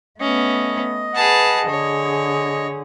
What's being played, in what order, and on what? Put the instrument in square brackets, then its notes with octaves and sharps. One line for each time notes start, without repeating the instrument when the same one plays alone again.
[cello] A3 B3 [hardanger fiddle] C#4 [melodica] D#5
[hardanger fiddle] G#4 A5 [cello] B4 F#5
[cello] D3 G#4 [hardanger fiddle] C#5